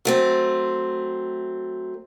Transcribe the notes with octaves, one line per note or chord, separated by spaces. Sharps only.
F#3 A3 C4